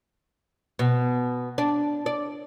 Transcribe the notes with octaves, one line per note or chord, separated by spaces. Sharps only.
B2
D4
D5